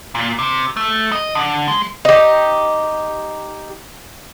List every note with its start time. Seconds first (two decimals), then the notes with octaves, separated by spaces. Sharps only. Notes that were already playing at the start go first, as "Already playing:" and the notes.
0.15 A#2
0.39 C3
0.77 A3
1.12 D#5
1.35 D3
1.68 G#3
2.05 D#4 G4